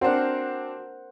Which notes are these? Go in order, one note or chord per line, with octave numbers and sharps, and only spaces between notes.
C4 D4 F#4 A#4 C5 F#5